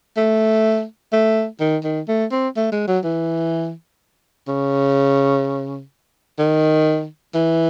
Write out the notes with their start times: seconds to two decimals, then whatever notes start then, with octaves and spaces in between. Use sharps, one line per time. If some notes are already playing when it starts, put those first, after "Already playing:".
0.17 A3
1.12 A3
1.60 D#3
1.84 D#3
2.08 A3
2.32 C4
2.56 A3
2.72 G#3
2.87 F#3
3.04 E3
4.47 C#3
6.39 D#3
7.34 E3